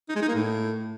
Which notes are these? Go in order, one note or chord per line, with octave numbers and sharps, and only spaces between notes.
D#4
G#3
D#4
A#3
A2